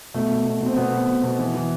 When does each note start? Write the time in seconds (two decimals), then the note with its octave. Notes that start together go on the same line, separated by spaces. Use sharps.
0.14 B2 A3
0.30 B2
0.45 B2
0.61 B2
0.66 C4
0.77 B2 B3
0.92 B2
1.08 B2
1.24 B2
1.39 E3
1.54 E3